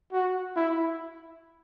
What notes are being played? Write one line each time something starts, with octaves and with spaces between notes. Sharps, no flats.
F#4
E4